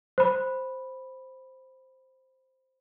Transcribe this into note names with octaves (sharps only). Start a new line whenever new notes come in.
C5 B5